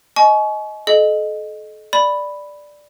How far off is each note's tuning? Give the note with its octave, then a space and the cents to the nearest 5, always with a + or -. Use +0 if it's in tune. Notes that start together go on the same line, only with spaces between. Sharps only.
D#5 +10 G#5 +40 C#6 +15
A4 -35 D#5 -15
D5 +0 B5 +0